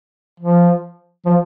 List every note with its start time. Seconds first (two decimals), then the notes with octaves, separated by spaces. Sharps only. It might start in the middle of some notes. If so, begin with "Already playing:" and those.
0.40 F3
1.25 F3